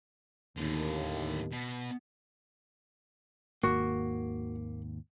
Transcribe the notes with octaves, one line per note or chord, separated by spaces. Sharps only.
D#2 A2 D3
B2
G#1 D#2 A#3 F#4